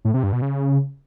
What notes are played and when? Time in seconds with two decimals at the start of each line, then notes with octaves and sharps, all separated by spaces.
0.05 A2
0.14 C3
0.23 G2
0.32 B2
0.42 C#3